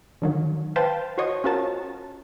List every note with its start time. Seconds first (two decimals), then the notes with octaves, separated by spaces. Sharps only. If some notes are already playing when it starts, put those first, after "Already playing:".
0.22 D3 D#3 F#3
0.76 B4 C5 F5 G5 A5
1.18 F#4 C5 C#5 D#5
1.44 C#4 F4 F#4 A#4 A5